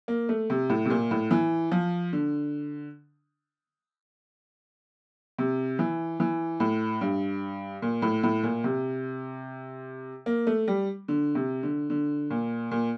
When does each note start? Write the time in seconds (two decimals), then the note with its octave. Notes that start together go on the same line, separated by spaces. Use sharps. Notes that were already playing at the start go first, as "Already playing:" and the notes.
0.08 A#3
0.29 A3
0.50 C3
0.70 A2
0.85 C3
0.90 A#2
1.11 A2
1.31 E3
1.72 F3
2.13 D3
5.38 C3
5.79 E3
6.20 E3
6.60 A2
7.01 G2
7.82 A#2
8.02 A2
8.23 A2
8.43 A#2
8.64 C3
10.26 A#3
10.47 A3
10.68 G3
11.08 D3
11.35 C3
11.63 D3
11.90 D3
12.30 A#2
12.71 A#2